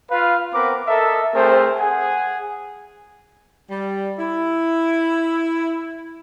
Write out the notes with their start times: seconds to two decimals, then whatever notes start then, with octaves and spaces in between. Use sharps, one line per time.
0.11 F4 B4 F5
0.54 B3 C4 A#4 B4 D6
0.88 A4 A#4 D#5 E5
1.34 A3 C4 G#4 A#4 C5
1.78 G#4 F#5 G#5
3.69 G3
4.18 E4